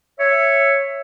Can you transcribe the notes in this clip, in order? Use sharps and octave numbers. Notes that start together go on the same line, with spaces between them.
C#5 E5